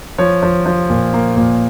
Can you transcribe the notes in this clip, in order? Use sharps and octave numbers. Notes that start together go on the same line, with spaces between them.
F3 C#5
F3
F3
A#2
A#3
A#2